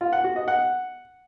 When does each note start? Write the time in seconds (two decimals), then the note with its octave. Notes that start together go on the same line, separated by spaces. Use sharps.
0.01 F4
0.13 F#5
0.24 F#4
0.36 D#5
0.48 F#5